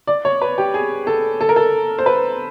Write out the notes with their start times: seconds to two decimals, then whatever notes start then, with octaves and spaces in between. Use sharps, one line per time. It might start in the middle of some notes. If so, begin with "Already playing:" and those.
0.07 D5
0.25 C#5
0.42 B4
0.58 G4
0.74 G#4
1.07 A4
1.41 A4
1.49 A#4
1.56 A4
1.99 C5
2.06 B4